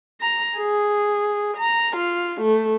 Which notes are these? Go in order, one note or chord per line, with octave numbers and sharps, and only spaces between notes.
A#5
G#4
A#5
F4
A3